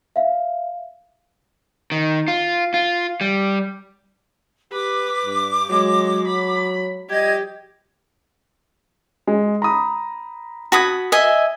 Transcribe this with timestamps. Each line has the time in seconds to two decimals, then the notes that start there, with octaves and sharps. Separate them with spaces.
0.16 E5 F5
1.92 D#3
2.28 F4
2.74 F4
3.21 G3
4.72 G4 B4 D6
5.24 G2
5.70 F#3 G#3
6.27 B5
7.09 F3 G3 G4 D#5 G#6
9.27 G#3
9.62 A#5 B5 D#6
10.72 F#4 A5 B5 D#6 G#6
11.12 D#5 E5 G#5